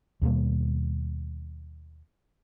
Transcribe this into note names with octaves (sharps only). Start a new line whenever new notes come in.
D#2 B2 G3 A#3